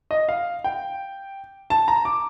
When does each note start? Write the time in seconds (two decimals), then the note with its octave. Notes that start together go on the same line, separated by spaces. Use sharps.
0.11 D#5
0.29 F5
0.64 G5
1.70 A5
1.88 A#5
2.05 D6